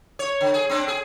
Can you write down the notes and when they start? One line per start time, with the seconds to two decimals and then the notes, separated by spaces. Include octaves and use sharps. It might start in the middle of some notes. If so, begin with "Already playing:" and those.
0.19 C#5
0.41 D3
0.54 G#4
0.69 C4 D4
0.88 G#4